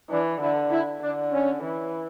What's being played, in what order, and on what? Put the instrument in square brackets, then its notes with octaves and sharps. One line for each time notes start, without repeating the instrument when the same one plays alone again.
[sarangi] E3 [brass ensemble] D4
[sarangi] D3 [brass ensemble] E4
[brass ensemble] E4
[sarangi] D3 [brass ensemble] D4
[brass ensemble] C#4
[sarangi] E3